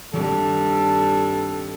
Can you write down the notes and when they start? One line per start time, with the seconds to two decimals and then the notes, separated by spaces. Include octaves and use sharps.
0.13 G2 D#3 C4 A4